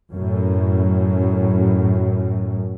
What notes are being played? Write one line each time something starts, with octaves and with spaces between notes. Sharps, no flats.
F#2 A2